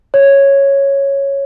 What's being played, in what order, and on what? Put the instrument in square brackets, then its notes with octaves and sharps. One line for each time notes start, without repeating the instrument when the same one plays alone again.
[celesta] C#5